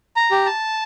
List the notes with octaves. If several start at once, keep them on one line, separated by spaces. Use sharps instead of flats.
A#5
G4
A5